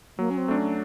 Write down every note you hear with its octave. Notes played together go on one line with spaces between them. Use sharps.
F#3 A#3
C#4
C4
A3 D4
C#4